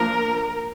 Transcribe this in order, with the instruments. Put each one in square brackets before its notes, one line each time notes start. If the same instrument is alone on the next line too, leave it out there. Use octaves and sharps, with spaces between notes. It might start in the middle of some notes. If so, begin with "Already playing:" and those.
Already playing: [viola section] F3 A#3 D4 A#4